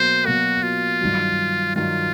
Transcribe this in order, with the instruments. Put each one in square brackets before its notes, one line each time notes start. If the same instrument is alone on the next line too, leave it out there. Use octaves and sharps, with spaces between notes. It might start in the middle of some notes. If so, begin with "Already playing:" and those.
Already playing: [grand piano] B2 F#3 A#3 [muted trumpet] C5
[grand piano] B2 F#3 A#3 [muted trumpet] F#4
[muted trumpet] F4
[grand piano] G2 D#3 F#3
[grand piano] G2 D#3 F#3 [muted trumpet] F4